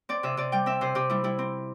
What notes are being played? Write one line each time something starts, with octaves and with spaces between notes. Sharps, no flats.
C4 D5
C3 E5
C3 D5
G3 G5
C4 E5
C3 C5
C3 G4
G3 E4
G3 E4
C4